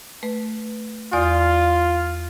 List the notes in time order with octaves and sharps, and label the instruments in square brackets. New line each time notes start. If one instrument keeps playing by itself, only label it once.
[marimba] A3 B4
[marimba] E2 D5 D#6 [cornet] F4